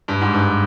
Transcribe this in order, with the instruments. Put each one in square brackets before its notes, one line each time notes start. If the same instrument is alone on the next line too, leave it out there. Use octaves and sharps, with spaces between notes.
[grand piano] G2
G#2
G2